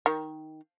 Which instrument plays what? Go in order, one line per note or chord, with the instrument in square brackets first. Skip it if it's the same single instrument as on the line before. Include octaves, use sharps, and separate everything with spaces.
[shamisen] D#3